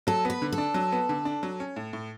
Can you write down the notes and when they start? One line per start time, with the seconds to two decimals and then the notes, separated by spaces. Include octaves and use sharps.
0.07 F#3 A4
0.25 B3 B4
0.42 D3
0.52 A4
0.58 D4
0.74 F#3
0.92 B3
1.09 D3
1.25 D4
1.43 F#3
1.60 C#4
1.76 A2
1.93 A2